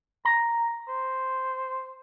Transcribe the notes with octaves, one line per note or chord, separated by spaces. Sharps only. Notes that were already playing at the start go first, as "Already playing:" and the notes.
A#5
C5